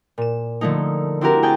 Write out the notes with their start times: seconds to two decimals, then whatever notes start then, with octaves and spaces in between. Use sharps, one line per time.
0.18 A#2 E7
0.61 D3 F3 A3 A#3 D#4
1.21 C4 D4 E4 F#4 G4 A#4
1.42 C4 G#4 G5 A5 G#6